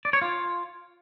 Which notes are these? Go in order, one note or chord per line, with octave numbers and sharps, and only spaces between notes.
D5
C#5
F4